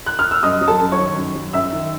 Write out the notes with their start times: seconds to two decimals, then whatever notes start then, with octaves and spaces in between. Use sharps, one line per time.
0.06 F#6
0.19 F6
0.31 E6
0.43 F#2 D#5 D#6
0.61 F#3
0.68 A4 A5
0.80 F#2
0.92 C#5 C#6
0.99 D#3
1.17 F#2
1.35 F#3
1.53 F#2 E5 E6
1.72 D#3